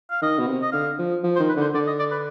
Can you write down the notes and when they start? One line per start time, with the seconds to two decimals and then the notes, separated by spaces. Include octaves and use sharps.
0.10 F5
0.22 D#3 D#5
0.39 B2
0.47 C3
0.62 D#5
0.72 D3 F5
0.98 F3
1.23 F3
1.36 C5
1.40 D#3
1.49 B4
1.56 D3 C5
1.74 D3 D5
1.87 D#5
1.99 D5
2.11 B4